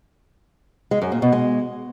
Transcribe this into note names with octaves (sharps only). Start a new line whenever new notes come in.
G#3
F#2
A#2
B2
G#3